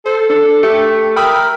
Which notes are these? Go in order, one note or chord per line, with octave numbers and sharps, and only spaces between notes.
A4 C5
D4 A4
A3 G4 C#7
A#4 G5 B5 D#6 E6